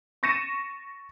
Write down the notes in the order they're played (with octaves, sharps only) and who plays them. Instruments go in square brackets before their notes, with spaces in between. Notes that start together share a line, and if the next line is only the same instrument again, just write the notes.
[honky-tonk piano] C#6 A6 A#6 C#7 D#7 E7